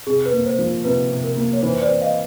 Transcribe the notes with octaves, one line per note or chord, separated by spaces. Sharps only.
C3 G#4
B4
A#3
C5
F3
C3 B4
C3
A#4
A#3
C#5
E3 C5
C5 D5
C4
D#5 F5